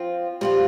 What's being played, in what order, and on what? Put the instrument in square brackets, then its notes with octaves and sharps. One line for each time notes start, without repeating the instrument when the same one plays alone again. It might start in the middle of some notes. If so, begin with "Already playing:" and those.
Already playing: [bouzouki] F3 C4 F4
[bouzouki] F3 C4 F4 [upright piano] G3